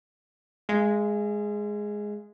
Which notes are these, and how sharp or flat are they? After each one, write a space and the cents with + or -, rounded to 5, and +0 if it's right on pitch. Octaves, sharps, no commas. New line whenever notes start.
G#3 +0 F5 -45